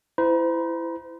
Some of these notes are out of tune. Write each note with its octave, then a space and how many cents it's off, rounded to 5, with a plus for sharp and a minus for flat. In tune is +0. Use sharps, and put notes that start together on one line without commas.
E4 +15 C5 -40 A#5 +40